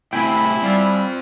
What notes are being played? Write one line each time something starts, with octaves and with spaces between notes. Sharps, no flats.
A2 C3 C4 E4 G5 G#5 B5
G3 C4 F4